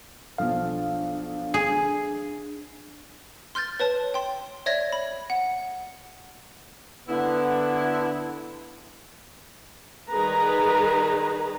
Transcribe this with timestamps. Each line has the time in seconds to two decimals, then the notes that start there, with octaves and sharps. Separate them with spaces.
0.38 B1 F3 D4 A4 F5
1.54 G#4
3.55 C6 F6 G6 A6
3.80 B4 C#5 A5
4.14 G5 C6
4.66 C#5 D5 E5 G#6 A#6
4.92 B5
5.30 F#5
7.09 D3 B3 E4
10.09 D#3 G3 G#4 B4 A#5